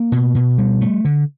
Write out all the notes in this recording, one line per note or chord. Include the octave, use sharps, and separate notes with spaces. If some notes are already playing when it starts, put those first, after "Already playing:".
Already playing: A#3
B2
B2
G3
A3
D3